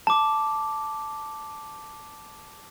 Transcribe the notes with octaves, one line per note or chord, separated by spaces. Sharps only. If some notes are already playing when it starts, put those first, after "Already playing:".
A5 D6